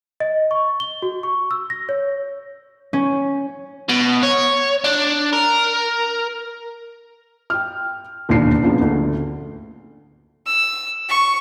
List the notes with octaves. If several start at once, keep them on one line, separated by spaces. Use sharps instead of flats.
D#5
C#6
G7
F#4
C#6
E6
A#6
C#5
C#4
B2
C#5
D4
A#4
G5 F6
E1 D#2 A#2 D4 C7
C#3 F3 A#3 B3 D4
D2
E6
C#6